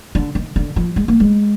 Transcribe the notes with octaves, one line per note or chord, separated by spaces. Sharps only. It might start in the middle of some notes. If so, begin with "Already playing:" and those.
D3
D#3
D3
F3
G#3
A#3
G#3